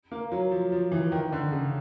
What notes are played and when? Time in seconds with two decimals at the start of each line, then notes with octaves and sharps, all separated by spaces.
0.12 A#3
0.32 F#3
0.51 F3
0.72 F3
0.92 E3
1.12 D#3
1.33 D3
1.52 C#3